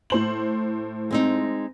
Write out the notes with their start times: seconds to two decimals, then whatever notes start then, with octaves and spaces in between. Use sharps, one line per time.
0.10 A2 C5 F#7
1.11 G#3 C4 D#4